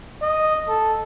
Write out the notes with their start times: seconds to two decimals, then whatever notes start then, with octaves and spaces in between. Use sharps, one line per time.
0.22 D#5
0.68 A4